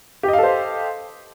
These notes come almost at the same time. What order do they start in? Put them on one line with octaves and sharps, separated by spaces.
G4 D#5 F5 A4 C5